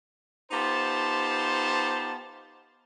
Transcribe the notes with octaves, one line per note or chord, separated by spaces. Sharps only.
B3 D#4 F4 G4 C5 A5